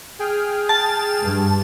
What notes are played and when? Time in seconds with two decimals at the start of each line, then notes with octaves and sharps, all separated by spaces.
0.19 G#4 G5 F6
0.69 A5
1.22 G2